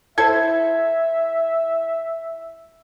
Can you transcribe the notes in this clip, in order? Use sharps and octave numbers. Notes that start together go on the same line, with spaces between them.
E4 A4 C5 E5 G#6